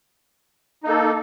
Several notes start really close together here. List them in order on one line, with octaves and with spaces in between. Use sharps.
D#4 A#3 A4